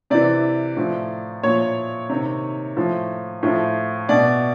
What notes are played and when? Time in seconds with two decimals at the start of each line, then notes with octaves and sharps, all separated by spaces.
0.10 C3 E3 D5
0.77 A2 F3
1.43 A#2 F3 C#5
2.09 C3 D#3
2.76 A2 F3
3.43 A2 F3
4.09 B2 D5